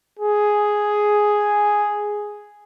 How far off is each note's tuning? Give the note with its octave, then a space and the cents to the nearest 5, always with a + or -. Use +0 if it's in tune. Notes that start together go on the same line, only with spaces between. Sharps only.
G#4 +0